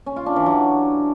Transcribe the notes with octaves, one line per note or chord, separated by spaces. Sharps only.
C#4
F4
D4
E3
F#3